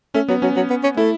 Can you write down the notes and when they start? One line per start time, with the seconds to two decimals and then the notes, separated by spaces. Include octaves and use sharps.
0.14 A3 C#4
0.28 F#3 B3
0.42 F#3 C#4
0.56 F#3
0.70 B3
0.84 C#4
0.97 A3 E4